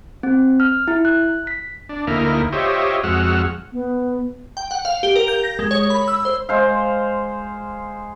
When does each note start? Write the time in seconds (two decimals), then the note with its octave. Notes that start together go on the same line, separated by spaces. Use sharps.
0.23 C4
0.60 F6
0.88 E4
1.05 F#6
1.47 B6
1.89 D4
2.07 D2 A#3 D#4 E4 A#4 F6
2.53 F4 G4 C5 C#5 D#5 E5
3.03 F2 G#3 F#4 F#5 E6 F6
3.72 B3
4.57 G5
4.71 F#5
4.85 F5
5.03 G4
5.16 A#4
5.28 G6
5.44 A#6
5.59 G#3
5.71 C#5
5.90 B5
6.08 E6
6.25 C5
6.49 G#3 C5 F5